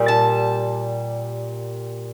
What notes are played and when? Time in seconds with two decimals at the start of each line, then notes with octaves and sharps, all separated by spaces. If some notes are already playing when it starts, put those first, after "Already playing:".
Already playing: A#2 G3
0.08 A5